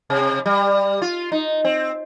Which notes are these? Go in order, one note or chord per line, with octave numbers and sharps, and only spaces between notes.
C3
G3
F4
D#4
C4